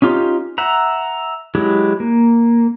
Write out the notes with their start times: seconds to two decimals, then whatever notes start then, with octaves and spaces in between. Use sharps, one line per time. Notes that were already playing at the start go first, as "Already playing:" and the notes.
0.02 C#4 D#4 F4 G4
0.58 E5 F#5 A#5
1.55 F#3 G#3 E4 G4
2.00 A#3